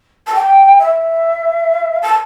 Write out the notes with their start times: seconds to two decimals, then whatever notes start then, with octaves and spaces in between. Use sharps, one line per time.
0.26 A5
0.34 G5
0.79 E5
2.02 A5